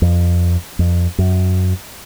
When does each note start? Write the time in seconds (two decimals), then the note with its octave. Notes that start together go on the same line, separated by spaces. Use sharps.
0.02 F2
0.79 F2
1.18 F#2